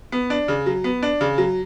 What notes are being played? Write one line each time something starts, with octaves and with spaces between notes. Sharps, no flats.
B3
D4
C#3
F#3
B3
D4
C#3
F#3